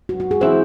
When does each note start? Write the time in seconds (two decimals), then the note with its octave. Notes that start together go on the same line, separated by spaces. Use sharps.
0.09 F#4
0.20 F#4
0.31 G#4
0.41 E3 C4 E4 C5